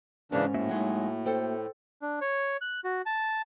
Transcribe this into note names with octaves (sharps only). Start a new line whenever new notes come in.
G#2 C#3 E3 C#4 D4 A#4
A2 A#3 F#4 E5
F#3 G#3 D#4
A4 C5 G5
D4
C#5
F#6
F#4
A5